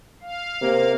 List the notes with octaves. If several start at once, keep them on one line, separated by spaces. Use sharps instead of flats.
F5
C3 A#3